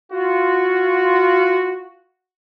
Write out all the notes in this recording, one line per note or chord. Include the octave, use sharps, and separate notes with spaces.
F4 F#4